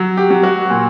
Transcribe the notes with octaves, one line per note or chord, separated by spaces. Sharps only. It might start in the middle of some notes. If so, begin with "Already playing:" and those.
Already playing: F#3
G4
F#3
F#4
A#2